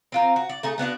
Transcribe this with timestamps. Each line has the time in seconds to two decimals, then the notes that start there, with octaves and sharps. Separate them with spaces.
0.12 C4 F4 A#4
0.36 F#4
0.49 D5
0.63 A3 D#4 G#4
0.78 A3 B3 D4 F#4